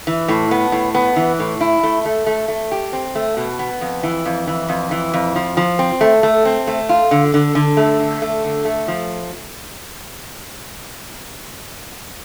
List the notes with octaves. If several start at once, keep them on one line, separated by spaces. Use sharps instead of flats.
E3
A2
B3
A2
B3
E3
A2
E4
A3
A3
A3
A3
G4
C4
A3
B2
B3
F2
E3
F2
E3
F2
E3
F2
F3
F3
C4
A3
A3
C4
A3
F4
D3
D3
D3
A3
D3
A3
D3
A3
F3